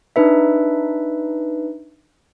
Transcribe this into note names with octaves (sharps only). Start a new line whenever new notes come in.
D4 D#4 B4 E5